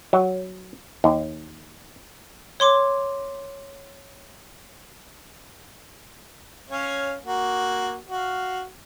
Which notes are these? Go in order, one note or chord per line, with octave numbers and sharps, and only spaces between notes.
F#3
D#2
C#5 C6 D6
C#4 C#5 F5
A#3 F#4
F#4 F5